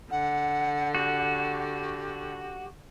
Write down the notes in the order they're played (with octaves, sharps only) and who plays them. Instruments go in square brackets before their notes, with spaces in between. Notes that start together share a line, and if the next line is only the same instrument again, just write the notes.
[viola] D3 [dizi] F#5
[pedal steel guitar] F#4 [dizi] G4